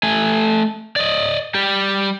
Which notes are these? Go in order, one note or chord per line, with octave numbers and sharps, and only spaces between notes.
A3 G#5
D5 D#5
G3 G4